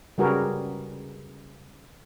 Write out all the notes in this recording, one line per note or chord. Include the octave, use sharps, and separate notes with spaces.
C#3 G3 F#4 G#4 A#4 B4